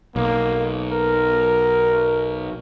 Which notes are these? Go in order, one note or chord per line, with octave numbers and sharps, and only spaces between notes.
B1 A#3
A#4